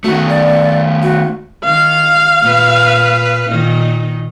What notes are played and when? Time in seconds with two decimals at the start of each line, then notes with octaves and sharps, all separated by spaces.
0.04 D#3 A3 F#4
0.29 D5
1.02 F#4
1.64 D#3 F5
2.42 A#2 B4
3.50 A#2 D#3 D#4